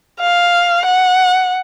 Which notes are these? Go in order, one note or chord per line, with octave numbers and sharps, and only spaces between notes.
F5
F#5